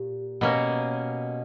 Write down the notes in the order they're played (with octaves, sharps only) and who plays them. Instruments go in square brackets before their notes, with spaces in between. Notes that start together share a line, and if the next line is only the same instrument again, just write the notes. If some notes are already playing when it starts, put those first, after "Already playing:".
Already playing: [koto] A#2 [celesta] G4
[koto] B2 A#3 C#4